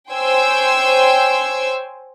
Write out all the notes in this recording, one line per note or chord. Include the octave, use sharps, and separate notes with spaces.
C5 C#5 G5 G#5 E6